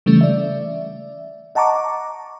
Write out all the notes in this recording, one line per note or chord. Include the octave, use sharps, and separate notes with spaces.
C#3 E3 G3 A3 C#4
D5 E5
D#5 F#5 A5 A#5 C#6 D6